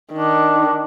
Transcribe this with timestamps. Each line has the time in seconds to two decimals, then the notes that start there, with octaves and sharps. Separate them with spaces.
0.12 D#3 D4